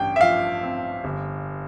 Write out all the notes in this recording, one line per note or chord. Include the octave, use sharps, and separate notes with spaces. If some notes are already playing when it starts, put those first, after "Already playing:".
Already playing: A1 G2 G5
E5
F3 F5
C4
G1